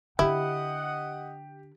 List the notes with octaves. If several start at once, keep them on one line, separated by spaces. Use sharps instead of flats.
D3 D4 E4 G4 D#5 F#5